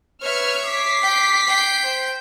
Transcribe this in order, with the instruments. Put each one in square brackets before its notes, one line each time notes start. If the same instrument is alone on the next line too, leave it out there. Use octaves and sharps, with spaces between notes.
[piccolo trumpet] B4 [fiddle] C#5 E5 [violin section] F6
[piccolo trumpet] D6 [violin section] B6 C7
[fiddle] G5
G5
[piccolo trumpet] C5